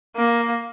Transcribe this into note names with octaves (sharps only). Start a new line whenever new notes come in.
A#3